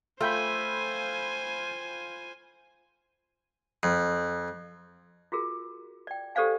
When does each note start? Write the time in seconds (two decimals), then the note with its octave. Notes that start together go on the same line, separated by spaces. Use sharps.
0.21 A3 F4 C5 G5 G#5 B5
3.83 F2
5.32 F4 F#4 G#4 A#4
6.07 D5 G5
6.35 G4 A4 C5 D5 F5 G#5